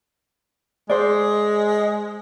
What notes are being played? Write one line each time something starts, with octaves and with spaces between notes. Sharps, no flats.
G#3 C5 D5